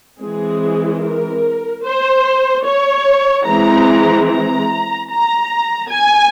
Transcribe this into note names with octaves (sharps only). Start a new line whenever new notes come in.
E3 G#3 C4 G#4
A#4
C5
C#5
E3 G#3 C4 A#5
A#5
A#5
G#5